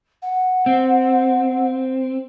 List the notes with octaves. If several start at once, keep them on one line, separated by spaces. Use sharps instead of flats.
F#5
C4